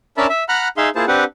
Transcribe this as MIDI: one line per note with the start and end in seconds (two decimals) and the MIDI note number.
0.17 0.27 61
0.17 0.27 62
0.17 0.27 70
0.17 0.27 76
0.17 0.27 81
0.17 0.27 83
0.30 0.44 76
0.49 0.68 78
0.49 0.68 82
0.49 0.68 83
0.49 0.68 89
0.49 0.68 90
0.77 0.89 63
0.77 0.89 68
0.77 0.89 76
0.77 0.89 77
0.77 0.89 84
0.95 1.05 58
0.95 1.05 64
0.95 1.05 65
0.95 1.05 68
0.95 1.05 72
0.95 1.05 81
1.08 1.24 60
1.08 1.24 62
1.08 1.24 67
1.08 1.24 71
1.08 1.24 78